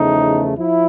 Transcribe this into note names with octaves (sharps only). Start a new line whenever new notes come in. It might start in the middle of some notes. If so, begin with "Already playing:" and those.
Already playing: E2 C#3 F3 A3 D#4
F3 E4